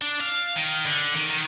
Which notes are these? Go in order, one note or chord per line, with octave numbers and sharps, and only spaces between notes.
D4
F5
D#3
D3
D#3
D#3